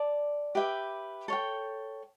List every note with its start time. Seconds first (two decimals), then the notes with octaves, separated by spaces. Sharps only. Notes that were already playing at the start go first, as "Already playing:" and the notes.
Already playing: D5 A5
0.55 G4 B4 E5 G5
1.28 A4 C#5 G5